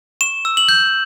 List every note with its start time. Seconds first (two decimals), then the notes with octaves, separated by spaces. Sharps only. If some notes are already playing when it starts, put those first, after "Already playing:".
0.21 C#6 E7
0.45 E6
0.57 F#7
0.69 G6